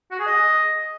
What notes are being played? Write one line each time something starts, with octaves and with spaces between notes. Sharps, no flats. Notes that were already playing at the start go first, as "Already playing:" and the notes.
F#4
G#4
D#5